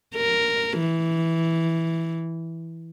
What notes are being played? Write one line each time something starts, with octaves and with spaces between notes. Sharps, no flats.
A#4
E3